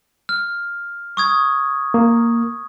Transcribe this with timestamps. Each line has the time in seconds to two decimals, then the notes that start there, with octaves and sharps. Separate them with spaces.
0.29 F6
1.17 C#6 D#6 G#6
1.94 A#3